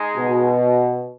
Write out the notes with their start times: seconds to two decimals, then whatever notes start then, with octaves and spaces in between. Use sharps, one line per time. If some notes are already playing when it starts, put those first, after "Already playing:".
Already playing: G#3 D#4 G#4
0.17 B2